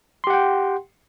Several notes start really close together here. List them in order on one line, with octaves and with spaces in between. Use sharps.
C6 G4 F#5 G5